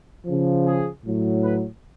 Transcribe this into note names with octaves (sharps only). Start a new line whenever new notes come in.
C#3 F3
G#4
A2 F#3
B4